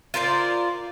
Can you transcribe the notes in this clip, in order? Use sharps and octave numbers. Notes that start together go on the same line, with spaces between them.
F4 A#4 C5 D5